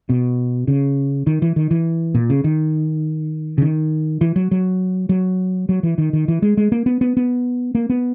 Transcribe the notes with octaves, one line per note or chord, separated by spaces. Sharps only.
B2
C#3
D#3
E3
D#3
E3
A#2
C#3
D#3
C#3
D#3
E3
F#3
F#3
F#3
F#3
E3
D#3
D#3
E3
G#3
G#3
A#3
B3
B3
B3
A#3
B3